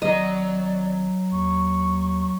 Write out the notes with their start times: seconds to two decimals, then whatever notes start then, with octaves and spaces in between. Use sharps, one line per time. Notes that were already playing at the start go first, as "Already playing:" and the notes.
0.02 G#1 F#3 D5 D#5 A#5
1.32 D#2 C#6